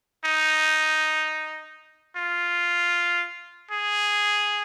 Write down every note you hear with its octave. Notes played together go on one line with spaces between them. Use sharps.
D#4
F4
G#4